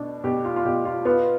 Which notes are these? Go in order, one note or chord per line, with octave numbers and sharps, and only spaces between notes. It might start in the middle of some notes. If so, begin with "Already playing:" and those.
Already playing: B2 D4
B2 G4
F4
F4
B2 G4
F4
B3 F4